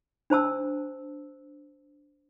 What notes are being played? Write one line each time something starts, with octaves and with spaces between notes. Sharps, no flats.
D4 C5 A5 E6